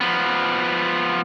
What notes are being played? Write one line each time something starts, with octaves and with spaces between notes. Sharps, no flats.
F3 B3